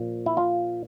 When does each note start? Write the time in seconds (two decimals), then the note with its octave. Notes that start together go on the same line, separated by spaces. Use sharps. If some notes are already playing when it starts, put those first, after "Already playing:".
Already playing: A#2 F3
0.26 E4
0.37 F4